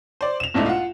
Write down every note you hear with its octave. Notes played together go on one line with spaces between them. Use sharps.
C5 D5
E7 F7
B1 G#2 A3 D4 E4 D#5
F4 F#5